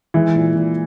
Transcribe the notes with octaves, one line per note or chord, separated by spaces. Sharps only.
E3 G#3 E4
A#2
A#2